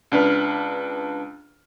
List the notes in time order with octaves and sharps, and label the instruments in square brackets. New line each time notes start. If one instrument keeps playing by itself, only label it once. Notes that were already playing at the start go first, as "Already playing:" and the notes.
[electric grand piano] C#2 D4 B4 F6